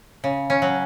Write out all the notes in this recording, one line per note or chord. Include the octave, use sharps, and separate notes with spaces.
C#3
C#4
F#3